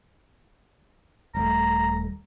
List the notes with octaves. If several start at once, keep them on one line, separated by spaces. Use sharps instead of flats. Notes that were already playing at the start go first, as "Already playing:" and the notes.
D#1 G3 A3 A#5